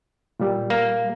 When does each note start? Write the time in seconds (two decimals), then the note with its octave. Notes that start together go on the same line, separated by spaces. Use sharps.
0.40 A#2 G3
0.70 A#3